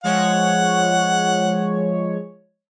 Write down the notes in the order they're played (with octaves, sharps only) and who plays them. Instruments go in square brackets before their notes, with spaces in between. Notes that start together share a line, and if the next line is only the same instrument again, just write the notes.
[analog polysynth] F3 G#3 C#5 [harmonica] F#5